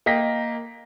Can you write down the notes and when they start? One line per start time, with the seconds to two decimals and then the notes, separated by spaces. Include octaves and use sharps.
0.06 A#3 D#5 G5 A#6 B6